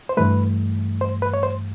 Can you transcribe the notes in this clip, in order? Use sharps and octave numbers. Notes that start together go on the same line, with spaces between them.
C5
G2 E3 A3 B4
C5
B4
C#5
C5